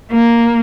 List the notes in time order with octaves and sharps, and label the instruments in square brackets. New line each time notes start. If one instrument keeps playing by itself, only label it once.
[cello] A#3